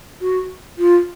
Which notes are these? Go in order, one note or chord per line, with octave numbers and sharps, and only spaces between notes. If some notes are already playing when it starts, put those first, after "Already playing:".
F#4
F4